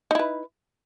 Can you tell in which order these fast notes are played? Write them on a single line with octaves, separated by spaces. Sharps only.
D#4 E4 B4